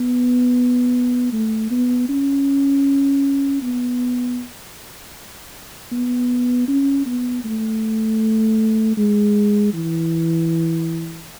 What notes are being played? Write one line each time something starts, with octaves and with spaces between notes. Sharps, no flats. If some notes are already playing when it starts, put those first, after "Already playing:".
Already playing: B3
A3
B3
C#4
B3
B3
C#4
B3
A3
G#3
E3